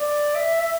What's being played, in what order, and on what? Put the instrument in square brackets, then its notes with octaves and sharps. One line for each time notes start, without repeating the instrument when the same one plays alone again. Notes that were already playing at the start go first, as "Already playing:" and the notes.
Already playing: [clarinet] D5
E5
E5